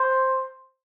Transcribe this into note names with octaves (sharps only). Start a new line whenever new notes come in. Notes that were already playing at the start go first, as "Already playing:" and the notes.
Already playing: C5